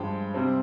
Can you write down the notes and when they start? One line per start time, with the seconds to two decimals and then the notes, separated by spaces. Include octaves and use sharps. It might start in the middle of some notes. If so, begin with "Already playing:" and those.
Already playing: G2 F3 G#3 G5
0.34 C3 G3 C4